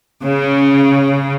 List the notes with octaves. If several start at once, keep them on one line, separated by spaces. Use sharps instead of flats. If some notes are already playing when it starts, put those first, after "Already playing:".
C#3